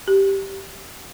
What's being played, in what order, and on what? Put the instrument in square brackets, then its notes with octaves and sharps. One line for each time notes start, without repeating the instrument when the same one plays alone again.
[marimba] G4